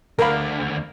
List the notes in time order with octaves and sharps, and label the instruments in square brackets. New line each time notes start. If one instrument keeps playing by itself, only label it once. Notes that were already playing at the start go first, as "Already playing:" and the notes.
[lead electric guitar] D2 D3 [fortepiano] A#4 F5 B5